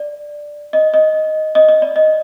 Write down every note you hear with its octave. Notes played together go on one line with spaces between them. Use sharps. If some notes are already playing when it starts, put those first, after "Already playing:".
Already playing: D5
D#5
D#5
D#5
D#5
D5
D#5